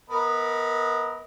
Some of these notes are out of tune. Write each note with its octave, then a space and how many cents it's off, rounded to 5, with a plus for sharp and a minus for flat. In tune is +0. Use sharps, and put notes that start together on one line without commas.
B3 -10 A#4 +0 D#5 +35